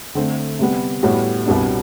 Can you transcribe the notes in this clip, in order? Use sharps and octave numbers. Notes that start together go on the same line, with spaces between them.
D3 A3 C4
C3 G3 B3
A2 G3 B3 F#4
C2 B2 G3 B3 D4